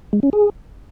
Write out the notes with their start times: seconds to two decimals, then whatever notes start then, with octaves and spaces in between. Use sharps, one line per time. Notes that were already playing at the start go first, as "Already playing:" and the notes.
0.13 G#3
0.23 C#4
0.33 G#4